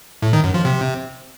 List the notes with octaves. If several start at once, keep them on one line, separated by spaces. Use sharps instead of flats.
A2
D#3
F#2
F3
C3